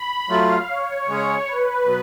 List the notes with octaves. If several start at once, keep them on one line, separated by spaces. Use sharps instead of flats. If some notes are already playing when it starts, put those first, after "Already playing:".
Already playing: B5
F#3 A3 F4 F5
C#5
C#3 G#3 C#4 G#4
B4
B2 F#3 B3